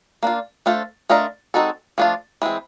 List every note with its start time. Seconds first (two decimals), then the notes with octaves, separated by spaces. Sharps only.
0.23 A#3 D4 F4
0.66 A3 D4 F4 A4 C5
1.09 A3 D4 F4 A#4 D#5
1.54 G#3 C4 D#4 F#4 A4
1.98 F3 A3 D4 F4
2.42 E3 G#3 C4